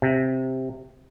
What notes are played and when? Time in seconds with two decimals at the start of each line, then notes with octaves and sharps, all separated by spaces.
0.02 C3